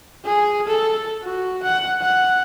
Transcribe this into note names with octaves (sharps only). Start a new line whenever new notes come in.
G#4
A4
F#4
F#5
F#5